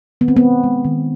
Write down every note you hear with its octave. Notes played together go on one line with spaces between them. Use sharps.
D#3 B3
C4
B3
G#3
G#3
D#3